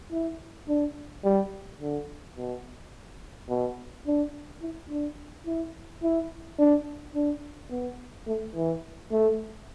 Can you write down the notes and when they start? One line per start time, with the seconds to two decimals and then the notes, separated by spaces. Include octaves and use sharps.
0.11 E4
0.68 D4
1.24 G3
1.80 D3
2.36 B2
3.49 B2
4.06 D4
4.62 E4
4.89 D4
5.46 E4
6.03 E4
6.59 D4
7.15 D4
7.70 B3
8.27 A3
8.55 E3
9.11 A3